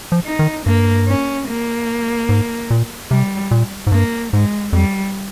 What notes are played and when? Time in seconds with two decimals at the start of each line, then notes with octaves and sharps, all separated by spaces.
0.12 F3
0.26 D#4
0.39 D#3
0.66 G2 A#3
1.08 C#4
1.48 A#3
2.29 G#2
2.70 A#2
3.11 C3 G3
3.51 A#2
3.87 G#2
3.92 G2 A#3
4.33 G#2 G#3
4.73 F2 G3